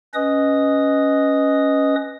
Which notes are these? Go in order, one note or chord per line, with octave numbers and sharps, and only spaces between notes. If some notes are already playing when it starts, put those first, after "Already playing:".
C#4 B4 D#5 D#6